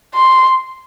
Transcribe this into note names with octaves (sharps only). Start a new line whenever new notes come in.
C6